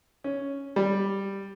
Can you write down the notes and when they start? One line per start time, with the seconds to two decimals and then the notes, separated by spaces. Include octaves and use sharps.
0.24 C#4
0.76 G3